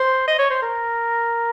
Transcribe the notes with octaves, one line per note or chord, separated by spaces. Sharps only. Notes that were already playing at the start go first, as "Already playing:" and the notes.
Already playing: C5
D#5
C#5
C5
A#4